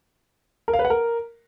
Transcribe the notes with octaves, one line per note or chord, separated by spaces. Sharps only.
A#4
F5
B4
F#5
A#4